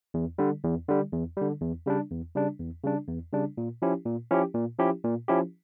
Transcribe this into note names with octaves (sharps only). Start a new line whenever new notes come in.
E2
D3 G3
E2
D3 G3
E2
D3 G3
E2
C#3 G3 D4
E2
C#3 G3 D4
E2
C#3 G3 D4
E2
C#3 G3 D4
A#2
F3 C#4 E4 G4
A#2
F3 C#4 E4 G4
A#2
F3 C#4 E4 G4
A#2
F3 C#4 E4 G4